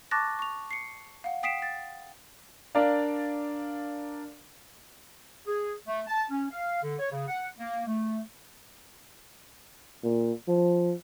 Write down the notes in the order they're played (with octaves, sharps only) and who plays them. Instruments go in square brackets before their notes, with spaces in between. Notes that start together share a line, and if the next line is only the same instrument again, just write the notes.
[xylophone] A5 C#6 D6 F#6 A6 A#6
C#6 F7
C7 C#7
F5 F#5
G5 D#6 B6 C7 D7 E7
A6
[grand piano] D4 A#4 D5 F5
[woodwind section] G#4
A3
A5
C#4
F5
D3
C#5
C#3
F#5
A#3
A3
[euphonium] A#2
F3